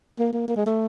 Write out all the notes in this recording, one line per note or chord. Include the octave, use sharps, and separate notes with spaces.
A#3
A#3
A#3
G#3
A3